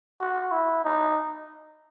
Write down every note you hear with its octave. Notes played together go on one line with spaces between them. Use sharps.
F#4
E4
D#4